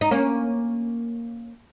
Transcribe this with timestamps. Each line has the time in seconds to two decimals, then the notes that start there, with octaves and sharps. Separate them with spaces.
0.01 D#4
0.11 A#3 C#4